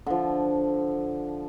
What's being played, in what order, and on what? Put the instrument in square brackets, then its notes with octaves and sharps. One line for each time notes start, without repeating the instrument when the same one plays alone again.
[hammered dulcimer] D3 F3